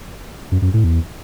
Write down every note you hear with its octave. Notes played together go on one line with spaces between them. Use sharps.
F#2
F#2
A2
E2